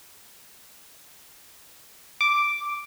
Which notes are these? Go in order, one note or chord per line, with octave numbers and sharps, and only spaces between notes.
D6